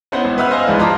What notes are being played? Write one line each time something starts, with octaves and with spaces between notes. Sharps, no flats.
B3 C#4 D#4 E4 C5 F#5
G#1
B4 E5 F#5 E6 F6
C5 D#5 F5 G#5 F6
A#1 G#2 E3 D4 B4
D#4 F4 A5 A#5 C6 D6